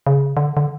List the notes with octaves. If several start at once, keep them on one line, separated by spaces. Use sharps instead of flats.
C#3
D3
D3